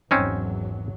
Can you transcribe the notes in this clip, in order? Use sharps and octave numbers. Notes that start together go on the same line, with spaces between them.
G#1 E2 F#3 C4 C#4 D#4